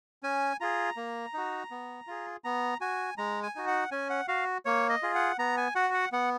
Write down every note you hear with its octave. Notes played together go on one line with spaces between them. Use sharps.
C#4 G#5
F4 G#4 A#5
A#3
D#4 F#4
B3
F4 G#4
B3 A#5
F#4 G#5
G#3 A#5
G#5
D#4 F#4
F#5
C#4 G#5
F#5
F#4 F5
A#3 C#5
D#5
F4 G#4
F#5
B3 A#5
G#5
F#4 F#5
F#5
B3 F#5